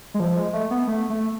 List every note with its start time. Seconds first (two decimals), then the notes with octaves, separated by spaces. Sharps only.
0.14 G#3
0.20 F3
0.36 G#3
0.53 A3
0.71 B3
0.87 A3
1.10 A3